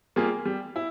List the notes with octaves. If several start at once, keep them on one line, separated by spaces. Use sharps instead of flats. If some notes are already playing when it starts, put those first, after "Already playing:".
G3 A#3 F4 G#4
G3
E4